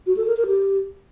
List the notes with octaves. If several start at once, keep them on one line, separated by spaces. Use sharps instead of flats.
F#4
A4
A#4
A#4
G4